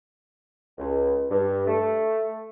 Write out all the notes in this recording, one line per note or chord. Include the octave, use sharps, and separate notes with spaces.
C#2
G2
A3